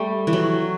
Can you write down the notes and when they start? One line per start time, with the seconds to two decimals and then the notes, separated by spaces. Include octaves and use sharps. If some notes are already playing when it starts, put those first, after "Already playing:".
Already playing: G3 A3
0.27 E3
0.33 F#3